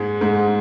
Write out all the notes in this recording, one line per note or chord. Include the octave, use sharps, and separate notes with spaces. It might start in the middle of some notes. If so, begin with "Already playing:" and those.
Already playing: G#2 G#3
G#2